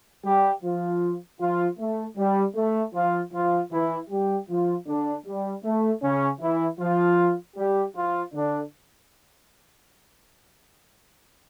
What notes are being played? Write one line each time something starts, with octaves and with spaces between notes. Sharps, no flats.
G3 G4
F3 F4
F3 F4
A3
G3
A3
F3 F4
F3 F4
E3 E4
G3 G4
F3 F4
D3 D4
G3
A3
C#3 C#4
E3 E4
F3 F4
G3 G4
F3 F4
D3 D4